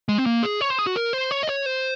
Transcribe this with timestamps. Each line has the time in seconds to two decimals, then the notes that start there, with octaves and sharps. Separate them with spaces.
0.09 G#3
0.18 C4
0.26 A#3
0.43 G#4
0.61 C#5
0.70 C5
0.79 G#4
0.87 F#4
0.96 A#4
1.13 C5
1.31 C#5
1.43 D#5
1.48 C#5
1.66 C5